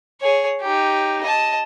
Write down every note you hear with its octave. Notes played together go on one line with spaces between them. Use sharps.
G#4 C#5
D#4 G4
D#5 A5